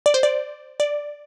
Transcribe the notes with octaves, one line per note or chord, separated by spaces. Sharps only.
D5
C5
D5
D5